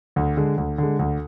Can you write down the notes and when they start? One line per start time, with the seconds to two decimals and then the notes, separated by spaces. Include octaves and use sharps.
0.16 D2
0.37 D3 G#3
0.58 D2
0.78 D3 G#3
0.99 D2